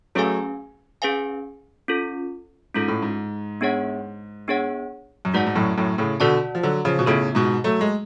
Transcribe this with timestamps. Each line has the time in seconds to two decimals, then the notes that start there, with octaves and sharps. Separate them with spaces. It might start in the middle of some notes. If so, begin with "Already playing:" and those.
0.15 F#3 A3 C#4 G#4 B4 F5 G#5
1.02 C#4 G#4 B4 F5 G#5
1.88 C#4 F4 A4
2.74 G#2 C#4 F4 A4
2.88 A2
3.02 G#2
3.61 B3 D4 G#4 C#5 F#5
4.48 B3 D4 G#4 C#5 F#5
5.25 F#2
5.34 G#2 F#4 B4 D5 F#5 A5
5.47 G#2
5.56 F#2 A2
5.77 F#2 A2
5.98 A2 C#3
6.20 B2 D3 F#4 B4 D5 F#5 A5
6.55 F3
6.63 D3 F#3
6.85 C#3 F3
6.99 B2
7.06 A2 C#3 B3 F4 A4
7.35 G#2 B2
7.64 F#3 A3
7.81 G#3